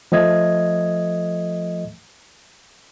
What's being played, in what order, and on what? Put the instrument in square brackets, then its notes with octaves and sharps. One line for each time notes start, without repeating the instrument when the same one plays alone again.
[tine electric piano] F3 A3 D#5 G#6